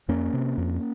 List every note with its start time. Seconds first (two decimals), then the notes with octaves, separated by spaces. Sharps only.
0.08 F2 A#3 C#4
0.33 C3
0.58 F2